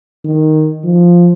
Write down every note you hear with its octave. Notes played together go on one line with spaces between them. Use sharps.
D#3
F3